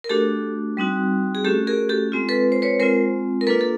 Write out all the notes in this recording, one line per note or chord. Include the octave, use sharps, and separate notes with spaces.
A#4
A3 D4 F#4 G4 A4
G3 C4 D#4 F#4
G#4
A3 C#4 F#4 G4 A4
G#4 A#4
G4 A4
G#3 C4 F4
A4 B4
C5
B4 C#5
G#3 C4 F4 A#4 C5
A#4
A#3 D4 F4 A4 B4
A4